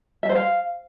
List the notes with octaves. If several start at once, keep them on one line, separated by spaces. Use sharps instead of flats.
E5
C5
F5